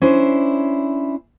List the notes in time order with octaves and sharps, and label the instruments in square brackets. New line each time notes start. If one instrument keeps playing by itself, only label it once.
[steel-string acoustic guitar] C#4 D4 E4 C5